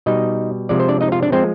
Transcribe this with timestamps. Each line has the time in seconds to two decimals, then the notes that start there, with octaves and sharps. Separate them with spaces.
0.06 B2 G3 D#4 D#5
0.69 C3 F3 G#3 D5
0.80 C5
0.88 D4 D5
1.01 D#4 D#5
1.12 F4 F5
1.22 D4 D5
1.32 F3 G#3 C4 C5